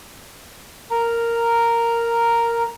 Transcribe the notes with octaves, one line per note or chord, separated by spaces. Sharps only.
A#4 A#5